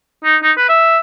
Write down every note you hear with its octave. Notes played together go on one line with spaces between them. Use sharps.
D#4
D#4
B4
E5